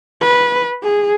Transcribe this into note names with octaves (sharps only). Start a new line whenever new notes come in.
B4
G#4